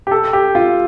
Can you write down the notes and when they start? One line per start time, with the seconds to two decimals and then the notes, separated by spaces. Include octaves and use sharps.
0.07 G4
0.11 A4
0.33 G4
0.55 F4